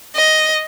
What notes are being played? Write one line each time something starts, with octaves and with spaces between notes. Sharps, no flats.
D#5